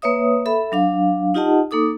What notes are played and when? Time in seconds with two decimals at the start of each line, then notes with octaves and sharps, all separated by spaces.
0.02 A#3 B4 C#5 E5 D#6
0.46 A4 E5 B5
0.72 F#3 D4 F5
1.34 D#4 F4 G4 D#5 F#5 A5
1.71 A#3 D#4 A4 D6 D#6